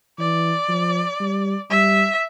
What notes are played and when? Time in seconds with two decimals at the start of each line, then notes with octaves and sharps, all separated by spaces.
0.19 E3 D5
0.69 F3
1.20 G3
1.71 G3 E5